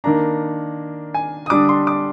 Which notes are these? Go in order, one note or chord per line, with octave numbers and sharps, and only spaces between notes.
D#3 A#3 D4 A#5
G#5
D#6
D3 G3 D4 D6
C6
D6